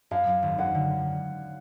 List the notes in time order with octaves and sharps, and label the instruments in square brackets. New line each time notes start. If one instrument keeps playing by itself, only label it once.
[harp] F#2 [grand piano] F5
[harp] F#2
G#1
[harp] F#2 [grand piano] F#5
[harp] D3